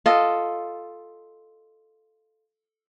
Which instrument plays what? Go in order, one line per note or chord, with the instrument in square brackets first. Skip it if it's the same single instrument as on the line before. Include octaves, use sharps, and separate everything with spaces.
[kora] F4 A4 D#5